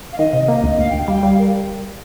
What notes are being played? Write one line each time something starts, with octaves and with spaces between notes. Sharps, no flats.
F5
D#3 D#5
C3
A#3 D#5
D2
D2 F5
D2 G5
F5
G3 G5
G3 F5
A#4